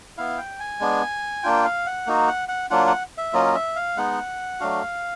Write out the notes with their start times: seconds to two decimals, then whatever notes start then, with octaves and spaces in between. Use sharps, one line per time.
0.17 B3 E4 F5
0.38 G5
0.60 G#5
0.80 G#3 B3 D4
1.43 A#3 D4 F4 G5
1.64 F5
1.86 F#5
2.07 A#3 D#4 F#4
2.28 F#5
2.49 F#5
2.70 F#3 A#3 D4 F4 F#5
2.87 F#5
3.18 E5
3.33 F#3 A#3 C#4 F4 D#5
3.55 E5
3.76 F5
3.97 G#3 B3 D#4 F#5
4.60 F#3 A3 D4 F#4 F5